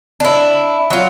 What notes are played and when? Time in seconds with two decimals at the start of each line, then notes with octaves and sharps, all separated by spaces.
0.20 D4 E4
0.90 F#3 F4